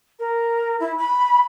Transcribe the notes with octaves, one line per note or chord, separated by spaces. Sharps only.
A#4
E4
B5